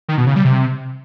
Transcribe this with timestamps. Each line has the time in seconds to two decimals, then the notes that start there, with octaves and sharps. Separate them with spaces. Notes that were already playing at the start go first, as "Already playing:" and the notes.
0.09 D#3
0.18 B2
0.27 C#3
0.36 G3
0.45 C3